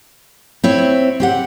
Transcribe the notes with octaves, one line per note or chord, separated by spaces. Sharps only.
C4 E4 C#5
C4 G4 F#5